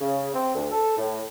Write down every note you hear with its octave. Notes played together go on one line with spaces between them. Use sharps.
C#3
C4
D2
A4
A2